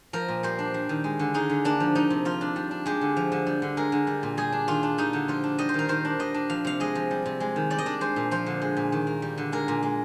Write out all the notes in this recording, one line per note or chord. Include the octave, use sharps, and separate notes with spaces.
F3 A#4
A#2
G3 C5
D4
G3
D#3
G#3
D3
G#3 D#4
D3
A#3 D4
F3
F3 D#4
C3
F3 F4
D4
G3
D4
G#3 G4
D3
F3
D3
G3
D3
G#3 A#4
D3
G3
A#2
G3 G#4
D4
D#3 F4
D4
G3 D#4
D3
F3 F4
D4
G3 D#5
C5
D#3 A#4
D#3 C5
D4
G3 D#5
D4
F3 F5
C3 F5
G#3 D#5
F3
G3
C3
G#3
D#3
G3 D5
D#5
D4 D5
G#3 C5
A#2
F3 C5
D3
G#3
A#2
D#3
A#3
G3
D3
G#3 A#4
A#2
G#3